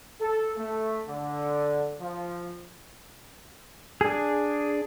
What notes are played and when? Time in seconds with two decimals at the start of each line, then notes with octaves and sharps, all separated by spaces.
0.20 A4
0.57 A3
1.08 D3
2.01 F3
4.01 D4 G#4